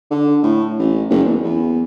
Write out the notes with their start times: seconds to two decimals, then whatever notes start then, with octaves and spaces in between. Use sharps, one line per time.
0.10 D3
0.43 A2
0.79 A1
1.10 F#1
1.24 E2
1.44 E2